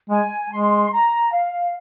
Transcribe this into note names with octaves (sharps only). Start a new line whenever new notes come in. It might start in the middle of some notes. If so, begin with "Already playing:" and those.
G#3 G#5
G#3 C6
A#5
F5